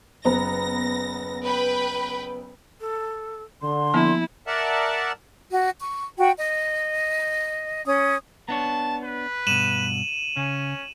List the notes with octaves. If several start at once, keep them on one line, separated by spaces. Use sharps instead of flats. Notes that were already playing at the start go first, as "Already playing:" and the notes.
F#1 B3 A#5 A#6
B4 G5 B5
A4
D3 C6
F3 A#3 B3 E4
A#4 D5 E5 F#5 A5
F#4
C#6
F#4 G5
D#5
C#4 D#6
B3 D4 C#5 A5
B4
G2 B2 D#7 E7 F#7
C#3 C#4